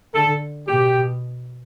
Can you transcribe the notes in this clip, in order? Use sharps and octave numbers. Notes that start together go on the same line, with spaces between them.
D3 A4
B2 G4